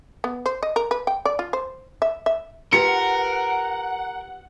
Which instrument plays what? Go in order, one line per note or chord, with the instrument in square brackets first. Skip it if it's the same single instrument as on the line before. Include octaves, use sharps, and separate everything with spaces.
[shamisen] B3
C5
D#5
A#4
B4
G5
D5
F4
C5
E5
E5
[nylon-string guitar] F4 G4 B4 [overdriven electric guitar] A#4 [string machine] F#5 [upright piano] C#7